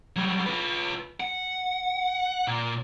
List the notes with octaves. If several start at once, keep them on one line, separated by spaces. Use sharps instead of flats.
F#3 G3
F4 B4
F#5
A#2